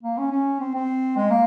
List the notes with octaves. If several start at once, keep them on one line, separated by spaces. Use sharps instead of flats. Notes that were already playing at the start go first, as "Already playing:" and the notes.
A#3
C#4
C#4
C4
C4
G#3
A#3